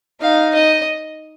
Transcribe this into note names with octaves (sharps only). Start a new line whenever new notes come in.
D#4 F5
D#5